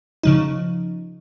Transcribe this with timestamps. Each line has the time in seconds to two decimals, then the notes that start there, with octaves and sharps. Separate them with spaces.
0.23 C#3 F3 D#4